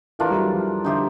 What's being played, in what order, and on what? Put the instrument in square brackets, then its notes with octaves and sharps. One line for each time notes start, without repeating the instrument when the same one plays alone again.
[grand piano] E3 [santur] A3 D4 F4 A#4
[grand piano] G3
F#3
F3
[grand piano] D3 [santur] D#4 G4 C5 E5